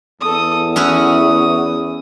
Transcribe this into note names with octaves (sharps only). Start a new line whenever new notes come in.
E2 A4 D#6
C#4 E4 F#4 D#6